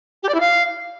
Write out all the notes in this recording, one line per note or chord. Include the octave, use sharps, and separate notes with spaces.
G4
D5
E4
F5